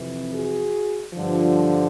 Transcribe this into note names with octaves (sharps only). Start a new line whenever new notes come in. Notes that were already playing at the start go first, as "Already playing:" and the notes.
Already playing: F2 C3 E3
F#4 G#4
G2 D3 F3